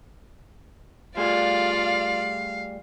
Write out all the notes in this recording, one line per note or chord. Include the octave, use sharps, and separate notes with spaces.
G3 A3 F4 G#4 D5 F5